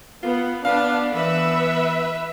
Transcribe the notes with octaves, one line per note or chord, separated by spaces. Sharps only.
B3 F4
B3 D4 F5
E3 B3 B4 E5